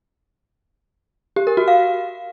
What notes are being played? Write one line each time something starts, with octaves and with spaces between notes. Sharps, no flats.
G4
A#4
F#4
F5